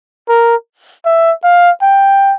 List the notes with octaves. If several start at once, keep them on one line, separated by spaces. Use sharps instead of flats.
A#4
E5
F5
G5